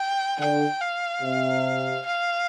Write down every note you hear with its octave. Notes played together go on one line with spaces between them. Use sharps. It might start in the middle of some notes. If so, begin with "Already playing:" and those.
Already playing: G5
D3 G5
F5
C3
F5